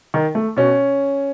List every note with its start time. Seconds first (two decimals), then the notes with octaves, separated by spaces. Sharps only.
0.14 D#3
0.35 A3
0.57 B2 C#4